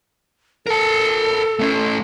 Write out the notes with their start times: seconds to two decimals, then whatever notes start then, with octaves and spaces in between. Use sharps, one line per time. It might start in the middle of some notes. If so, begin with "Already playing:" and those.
0.67 A4 A#4 A5
1.59 A3 C#4